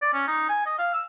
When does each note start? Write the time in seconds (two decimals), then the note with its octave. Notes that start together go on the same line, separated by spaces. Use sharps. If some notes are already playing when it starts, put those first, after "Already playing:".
0.02 D5
0.13 C#4
0.27 D#4
0.49 G#5
0.66 D#5
0.79 F5
0.94 E6